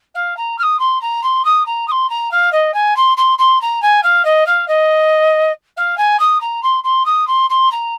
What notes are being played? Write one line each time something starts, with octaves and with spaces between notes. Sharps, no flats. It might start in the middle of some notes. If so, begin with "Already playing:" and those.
F5
A#5
F6
D#6
C6
A#5
C6
D#6
A#5
D#6
C6
A#5
F5
D#5
G#5
C6
C6
C6
A#5
G#5
F5
D#5
F5
D#5
F5
G#5
D#6
A#5
C6
C6
D#6
C6
C6
A#5